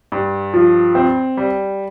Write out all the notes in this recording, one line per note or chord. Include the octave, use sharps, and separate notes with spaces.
G2
F3
C4
G3